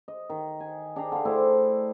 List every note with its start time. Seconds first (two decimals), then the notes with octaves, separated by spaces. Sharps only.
0.08 D#5
0.30 D#3
0.60 G#5
0.96 D4 G#4 G5 A#5
1.12 D3 F5
1.25 A3 D4 E4 C5